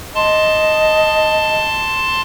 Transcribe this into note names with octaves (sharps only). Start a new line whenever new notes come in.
D#5 A5 C6